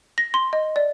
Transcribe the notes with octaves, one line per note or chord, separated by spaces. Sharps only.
A#6
C6
D#5
D5